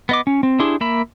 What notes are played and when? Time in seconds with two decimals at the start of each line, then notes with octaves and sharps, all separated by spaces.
0.09 B3 D#5 D6
0.27 C#4
0.43 C4
0.59 D4 E4 G4 G#4 C6
0.81 A#3 E5 B5